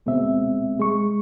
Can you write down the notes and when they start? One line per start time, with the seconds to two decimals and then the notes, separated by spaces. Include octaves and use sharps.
0.06 D2 B2 G#3 C4 E5
0.80 G#3 C#6